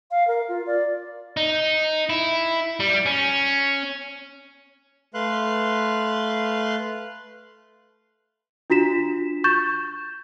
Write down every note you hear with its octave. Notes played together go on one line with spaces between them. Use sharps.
F5
A#4
F4
D5
D#4
E4
G3
C#4
A3 B4 F5 C6 F#6
D4 F4 F#4 B6 E7
C#6 G6 A6 E7